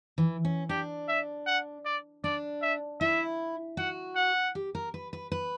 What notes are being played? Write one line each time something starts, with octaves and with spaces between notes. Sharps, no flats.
E3
C#4
D4 G4
E5
F#5
D5
D4 D5
E5
E4 E5
F#4 F#5
F#5
G4
A#4
B4
B4
B4